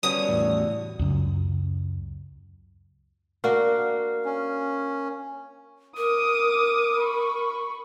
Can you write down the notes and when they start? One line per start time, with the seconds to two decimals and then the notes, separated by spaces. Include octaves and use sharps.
0.03 D3 G3 B3 C#4 F#4 C#5 D#6
0.29 E2 A2
0.99 C#2 F#2
3.44 A#3 D4 F#4 A#4 F5
4.25 C#4
5.97 A#4 D6 D#6
7.00 B5 C#6